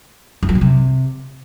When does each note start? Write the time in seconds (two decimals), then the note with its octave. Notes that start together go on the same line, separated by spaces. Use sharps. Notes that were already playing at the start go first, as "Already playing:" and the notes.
0.43 F#2
0.49 F#3
0.55 B2
0.61 C3